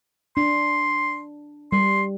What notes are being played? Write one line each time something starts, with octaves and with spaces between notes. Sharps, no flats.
D4 C6
G3 C6